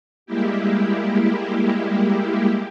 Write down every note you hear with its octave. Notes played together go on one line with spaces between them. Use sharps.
G3 G#3 A#3 E4 G4